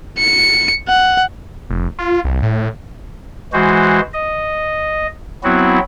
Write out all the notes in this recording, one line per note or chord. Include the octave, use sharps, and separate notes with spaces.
C#7
F#5
F1
F4
C2
A2
E3 G#3 F#4 C5
D#5
F#3 B3 C4 E4 F#4